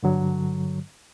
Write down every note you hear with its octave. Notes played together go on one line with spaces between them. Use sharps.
G2 D3 F#3